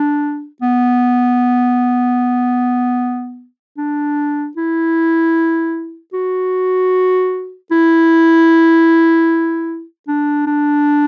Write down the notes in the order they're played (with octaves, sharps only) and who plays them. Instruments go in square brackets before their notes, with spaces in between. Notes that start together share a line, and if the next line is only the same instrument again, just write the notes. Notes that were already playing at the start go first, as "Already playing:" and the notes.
Already playing: [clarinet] D4
B3
D4
E4
F#4
E4
D4
D4